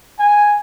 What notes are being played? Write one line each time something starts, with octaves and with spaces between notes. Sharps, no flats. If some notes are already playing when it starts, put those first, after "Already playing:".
G#5